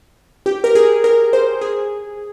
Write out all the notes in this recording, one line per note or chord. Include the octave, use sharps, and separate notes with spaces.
G4
A#4
G#4
A#4
C5
G#4